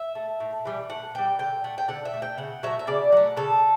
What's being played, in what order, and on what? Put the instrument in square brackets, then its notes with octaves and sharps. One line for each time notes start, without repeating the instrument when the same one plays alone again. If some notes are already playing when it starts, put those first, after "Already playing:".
Already playing: [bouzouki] E5
A3
A2
E3 G3
A2 F#5
E3 G3 G5
D3 G5
A3 F#5
G5
D3 F#5
E5
A3
G5
C#3 F#5
F#3 A3 E5
E5
C#3 D5
F#3 A3 F#5
C#3 A4